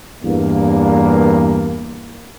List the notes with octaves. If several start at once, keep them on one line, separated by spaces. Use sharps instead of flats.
E2 G2 A#3